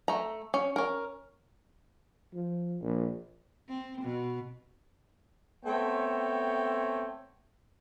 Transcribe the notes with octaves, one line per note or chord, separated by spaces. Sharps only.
A3 A#5
C#4
C#4 A#4
F3
A#1
C4
B2
A3 B3 C4 C#5 G5